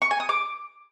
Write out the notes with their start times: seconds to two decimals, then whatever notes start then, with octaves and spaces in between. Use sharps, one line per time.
0.02 C#6
0.11 G#5
0.20 D#6
0.29 D6